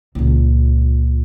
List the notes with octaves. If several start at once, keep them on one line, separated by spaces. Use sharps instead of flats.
C#2 A#2